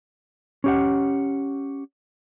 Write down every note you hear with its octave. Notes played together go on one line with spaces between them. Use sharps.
C#4 G4 F#5